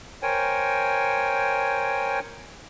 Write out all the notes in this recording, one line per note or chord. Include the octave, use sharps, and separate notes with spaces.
A#4 C5 C#5 G5 G#5